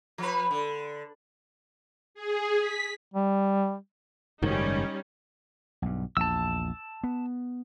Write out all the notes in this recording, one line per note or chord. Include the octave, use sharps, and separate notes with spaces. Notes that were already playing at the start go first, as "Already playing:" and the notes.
F3 B4
D3
G#4
B6
G3
F#1 G#2 D#3 G3 C#4 D#4
B1 G2
A#1 E2 A5 E6
B3